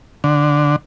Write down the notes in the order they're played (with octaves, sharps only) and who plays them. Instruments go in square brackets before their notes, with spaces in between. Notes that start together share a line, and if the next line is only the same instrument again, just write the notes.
[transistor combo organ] D3